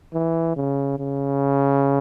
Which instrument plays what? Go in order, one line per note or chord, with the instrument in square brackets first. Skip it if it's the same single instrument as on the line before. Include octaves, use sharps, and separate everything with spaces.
[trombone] E3
C#3
C#3